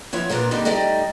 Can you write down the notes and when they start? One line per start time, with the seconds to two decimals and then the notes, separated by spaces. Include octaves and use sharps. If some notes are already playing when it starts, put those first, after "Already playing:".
0.13 F3 E4 C#5 F#5
0.29 A#2 B3 D4 A#4
0.51 D3 G3 A#3 C4 D4 D#4
0.65 G3 A3 D#4 D5 D#5